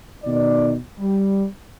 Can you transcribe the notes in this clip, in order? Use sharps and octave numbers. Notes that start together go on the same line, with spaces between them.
B2 D#3 D#4 D5
G3